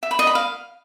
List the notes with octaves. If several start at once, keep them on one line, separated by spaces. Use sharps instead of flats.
E5
B5
D#5
B5
F5